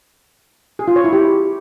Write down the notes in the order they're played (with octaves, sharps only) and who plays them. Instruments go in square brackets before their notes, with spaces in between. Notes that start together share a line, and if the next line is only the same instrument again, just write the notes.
[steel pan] G#4
F4
C#5
E4
G4